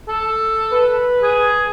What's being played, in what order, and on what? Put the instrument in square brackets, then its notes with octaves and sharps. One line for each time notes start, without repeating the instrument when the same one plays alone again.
[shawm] A4
[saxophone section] B4
[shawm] G#4